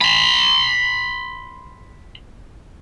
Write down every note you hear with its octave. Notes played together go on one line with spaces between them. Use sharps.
B5 C6